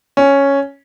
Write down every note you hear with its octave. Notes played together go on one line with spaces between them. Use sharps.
C#4